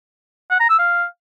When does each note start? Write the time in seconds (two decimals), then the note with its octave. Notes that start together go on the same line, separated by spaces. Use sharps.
0.50 F#5
0.60 A#5
0.69 E6
0.79 F5